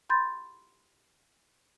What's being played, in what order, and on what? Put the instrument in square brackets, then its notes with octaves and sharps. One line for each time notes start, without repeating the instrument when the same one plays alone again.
[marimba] B5 C6 G6 A6